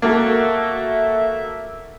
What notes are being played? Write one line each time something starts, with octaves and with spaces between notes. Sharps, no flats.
A#3 F#4 A4 E5